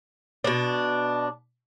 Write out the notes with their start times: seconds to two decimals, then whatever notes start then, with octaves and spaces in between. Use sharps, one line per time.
0.44 B2 D4